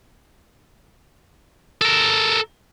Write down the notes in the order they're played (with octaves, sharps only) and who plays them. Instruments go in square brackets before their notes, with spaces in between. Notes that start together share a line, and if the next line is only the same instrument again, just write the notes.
[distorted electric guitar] A4 A#4